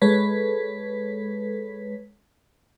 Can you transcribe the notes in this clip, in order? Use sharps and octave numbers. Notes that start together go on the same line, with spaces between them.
G#3 A4 B4 C#5 B6